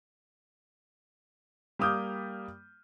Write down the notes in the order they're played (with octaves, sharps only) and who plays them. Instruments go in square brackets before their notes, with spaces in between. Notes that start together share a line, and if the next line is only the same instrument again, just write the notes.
[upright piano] G3 A#3 D6 D#6 F6 G6